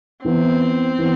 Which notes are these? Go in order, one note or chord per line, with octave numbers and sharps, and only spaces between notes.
E3 B3 C4 E4
E3 B3